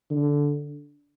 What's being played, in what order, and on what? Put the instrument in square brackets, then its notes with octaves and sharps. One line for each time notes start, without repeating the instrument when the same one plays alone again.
[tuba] D3